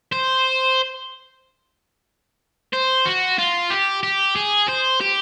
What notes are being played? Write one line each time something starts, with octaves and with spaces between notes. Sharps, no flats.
C5
C5
F#4
F4
G4
G4
G#4
C5
G4